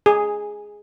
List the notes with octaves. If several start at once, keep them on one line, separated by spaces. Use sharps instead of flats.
G#4